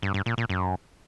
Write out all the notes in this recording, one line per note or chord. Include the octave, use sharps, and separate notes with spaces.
G2
G2
A#2
A#2
F#2